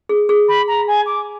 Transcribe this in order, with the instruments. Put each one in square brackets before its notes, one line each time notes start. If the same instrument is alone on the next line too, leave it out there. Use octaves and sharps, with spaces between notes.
[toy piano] G#4
G#4
[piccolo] B5
A#5
G#5
D6